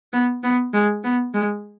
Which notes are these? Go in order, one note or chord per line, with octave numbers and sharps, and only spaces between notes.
B3
B3
G#3
B3
G#3